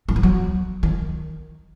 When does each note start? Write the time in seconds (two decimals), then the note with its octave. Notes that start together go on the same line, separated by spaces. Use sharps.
0.09 F#3
0.16 D#3
0.23 F#3
0.83 D#3